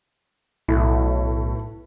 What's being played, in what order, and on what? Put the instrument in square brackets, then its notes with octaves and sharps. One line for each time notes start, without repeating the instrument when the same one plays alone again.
[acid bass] B1 [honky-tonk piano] A2